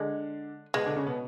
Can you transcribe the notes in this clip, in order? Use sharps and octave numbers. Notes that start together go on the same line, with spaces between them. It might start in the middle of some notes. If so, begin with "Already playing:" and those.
Already playing: D3 G#3 D4
B2 G#3 B3
D3 D4
C#3 C#4
B2 B3